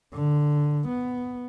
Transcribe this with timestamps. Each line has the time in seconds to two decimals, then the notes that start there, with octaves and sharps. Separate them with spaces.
0.13 D3
0.88 B3